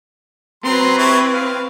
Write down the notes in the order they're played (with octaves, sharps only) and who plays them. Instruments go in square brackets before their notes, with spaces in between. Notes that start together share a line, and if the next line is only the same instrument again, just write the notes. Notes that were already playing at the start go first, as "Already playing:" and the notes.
[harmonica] F#3 A#5 C6 [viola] C4 B4
[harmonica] E4 G4 C#5
F5